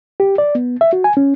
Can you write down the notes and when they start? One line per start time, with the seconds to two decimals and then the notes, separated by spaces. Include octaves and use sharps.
0.20 G4
0.38 D5
0.55 B3
0.81 E5
0.93 F#4
1.04 G#5
1.17 C#4